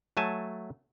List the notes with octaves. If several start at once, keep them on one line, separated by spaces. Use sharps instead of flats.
F#3 A3 G#5 A5